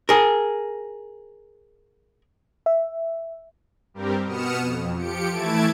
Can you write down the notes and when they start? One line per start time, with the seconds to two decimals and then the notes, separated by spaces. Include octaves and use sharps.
0.09 G#4 A#4
2.66 E5
3.94 G2 G3 C4 G4 A#4
4.24 B2 B3 D#6 F6 C#7 E7
4.58 F2
4.98 F3 G4 C#7 D7
5.30 E3 A3 E4 A5 G#6 D7